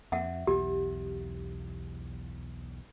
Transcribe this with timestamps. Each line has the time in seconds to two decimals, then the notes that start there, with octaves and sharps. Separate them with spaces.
0.12 F2 E5 F#5
0.47 B1 E2 G4